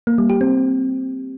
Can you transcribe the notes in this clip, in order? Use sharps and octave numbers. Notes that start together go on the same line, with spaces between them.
A#3
G3
G4
C4